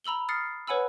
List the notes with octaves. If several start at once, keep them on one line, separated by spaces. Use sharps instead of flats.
A#5 B5 E6 F#7 G7
D#6 F6 A6 C7 C#7
B4 C#5 F#5 G#5 B5 E6